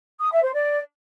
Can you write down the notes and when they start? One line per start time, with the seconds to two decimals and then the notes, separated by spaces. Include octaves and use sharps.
0.20 D#6
0.31 E5
0.43 C5
0.54 D5